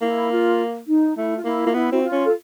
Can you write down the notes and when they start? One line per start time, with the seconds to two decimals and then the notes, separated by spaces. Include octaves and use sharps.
0.02 A#3 E4
0.31 F4
0.87 D#4
1.17 A3 E4
1.36 F4
1.45 A#3 E4
1.64 A#3 F4
1.74 B3 E4
1.92 C4 F#4
2.02 F4
2.12 C#4
2.25 A4